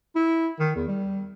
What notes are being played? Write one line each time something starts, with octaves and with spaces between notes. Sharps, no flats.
E4
D#3
E2
G3